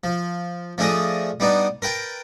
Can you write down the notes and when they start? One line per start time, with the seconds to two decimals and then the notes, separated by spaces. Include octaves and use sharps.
0.04 F3
0.78 F3 A3 D4 G#4 D#5
1.40 G3 B3 D4 D#4
1.82 A#4 B4 G5 A5